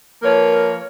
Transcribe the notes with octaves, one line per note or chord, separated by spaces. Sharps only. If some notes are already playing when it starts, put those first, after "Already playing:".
F3 A#3 A#4 B4 C#5